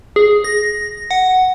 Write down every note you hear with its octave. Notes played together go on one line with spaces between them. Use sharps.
G#4
A#6
F#5